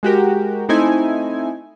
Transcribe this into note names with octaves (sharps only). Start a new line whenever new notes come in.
G#3 F#4 G4 A#4
A3 C4 D#4 E4 G#5